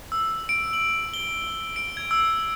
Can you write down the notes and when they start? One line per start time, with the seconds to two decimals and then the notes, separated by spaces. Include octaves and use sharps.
0.12 E6
0.49 D7
0.73 F#7
1.14 G7
1.76 D7
1.97 G#6
2.11 E6